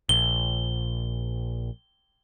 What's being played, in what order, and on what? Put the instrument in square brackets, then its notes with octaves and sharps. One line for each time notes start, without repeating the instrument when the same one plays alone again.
[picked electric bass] A#1 [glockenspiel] G7